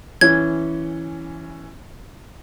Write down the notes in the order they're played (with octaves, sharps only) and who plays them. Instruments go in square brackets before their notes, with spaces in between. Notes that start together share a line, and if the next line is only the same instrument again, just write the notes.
[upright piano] E3 C#4 [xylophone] G#6